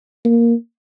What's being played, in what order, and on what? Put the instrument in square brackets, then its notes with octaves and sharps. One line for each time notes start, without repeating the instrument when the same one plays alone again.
[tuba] A#3